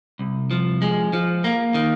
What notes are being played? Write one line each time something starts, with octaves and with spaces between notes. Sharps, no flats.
C2
F3
G#3
F3
A#3
D#3